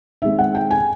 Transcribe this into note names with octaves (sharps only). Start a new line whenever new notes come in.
D#3 G#3 C4 E5
F#5
G5
G#5